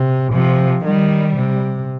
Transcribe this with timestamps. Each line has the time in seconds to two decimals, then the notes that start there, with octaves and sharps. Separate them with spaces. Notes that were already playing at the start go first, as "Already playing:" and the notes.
Already playing: C3
0.32 C3 F3
0.85 D#3 G3
1.36 C3